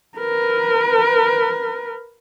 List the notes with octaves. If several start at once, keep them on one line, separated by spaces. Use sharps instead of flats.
A#4 B4